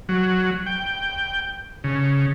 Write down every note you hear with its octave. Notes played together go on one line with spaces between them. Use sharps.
F#3
G5
C#3